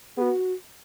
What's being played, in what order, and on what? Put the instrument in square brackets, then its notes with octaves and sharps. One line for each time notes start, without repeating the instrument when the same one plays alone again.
[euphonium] B3 [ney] F#4 G#4